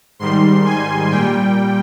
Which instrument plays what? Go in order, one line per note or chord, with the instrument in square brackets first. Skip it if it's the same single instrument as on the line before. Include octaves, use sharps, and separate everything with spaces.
[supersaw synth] G#2 D#3 G3 C6
G#5
A#2 G3 G5